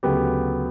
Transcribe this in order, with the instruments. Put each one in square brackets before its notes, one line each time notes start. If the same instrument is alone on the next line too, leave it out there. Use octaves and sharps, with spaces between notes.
[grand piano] D2 C#3 F#3 B3 G4